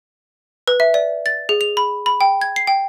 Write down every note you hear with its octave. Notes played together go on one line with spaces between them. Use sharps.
B4
E5
D5
A6
G#4
F7
B5
B5
G5
G#6
C7
G5